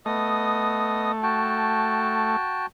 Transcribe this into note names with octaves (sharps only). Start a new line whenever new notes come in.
A3 B3 D#5 D#6
F#4 G5 A5